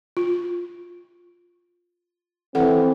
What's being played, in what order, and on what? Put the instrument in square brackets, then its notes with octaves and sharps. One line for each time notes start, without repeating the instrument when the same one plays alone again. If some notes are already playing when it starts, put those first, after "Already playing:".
[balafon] F4
[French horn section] E3 C4 [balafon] A4 F#5